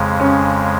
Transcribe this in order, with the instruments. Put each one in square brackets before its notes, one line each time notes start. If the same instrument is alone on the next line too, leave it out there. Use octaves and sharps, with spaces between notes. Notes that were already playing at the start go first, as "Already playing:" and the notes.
Already playing: [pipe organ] F2 C#3 G#3
[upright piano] C#4